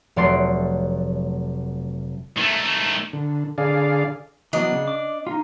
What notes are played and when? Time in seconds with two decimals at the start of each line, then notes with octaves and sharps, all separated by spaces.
0.16 F1 F#3 A3 D5 C6
2.38 D#3 A3
3.13 D3
3.58 D3 G#4 D5 F5
4.53 E3 F#3 B3 D4 D#5
4.72 C#3
4.88 D6
5.27 D#4 F4